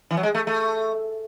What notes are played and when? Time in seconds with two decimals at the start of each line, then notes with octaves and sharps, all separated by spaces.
0.11 E3
0.17 F#3
0.23 G#3
0.35 A3
0.47 A3